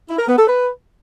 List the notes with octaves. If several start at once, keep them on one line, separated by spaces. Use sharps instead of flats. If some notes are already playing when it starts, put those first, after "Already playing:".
E4
A#4
B3
A4
B4